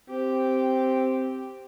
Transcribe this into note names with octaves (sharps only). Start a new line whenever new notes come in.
C4 G4